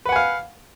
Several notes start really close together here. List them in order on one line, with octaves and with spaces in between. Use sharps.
B4 F#5 G#5 F5